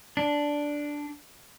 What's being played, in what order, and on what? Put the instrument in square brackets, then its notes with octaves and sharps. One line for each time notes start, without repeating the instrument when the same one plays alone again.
[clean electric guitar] D4